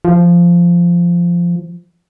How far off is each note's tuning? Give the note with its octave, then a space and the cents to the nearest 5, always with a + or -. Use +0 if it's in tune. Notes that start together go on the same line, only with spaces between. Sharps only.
F3 -10